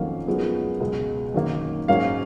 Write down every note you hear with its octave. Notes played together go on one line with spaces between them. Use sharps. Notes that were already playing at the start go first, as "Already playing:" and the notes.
Already playing: F2 D#3 F#3 A#3 C#4 F5
F#2 F3 G#3 B3
C#2 B2 G#3
F#2 D#3 A#3
G#2 F#3 A#3 C#4 F5